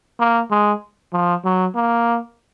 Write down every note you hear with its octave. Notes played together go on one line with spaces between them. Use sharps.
A#3
G#3
F3
F#3
A#3